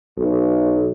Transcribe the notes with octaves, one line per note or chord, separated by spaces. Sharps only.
B1